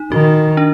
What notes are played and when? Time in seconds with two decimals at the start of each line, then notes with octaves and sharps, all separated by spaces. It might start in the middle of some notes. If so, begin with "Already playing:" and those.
Already playing: D#4
0.12 D#3 F#4
0.57 D4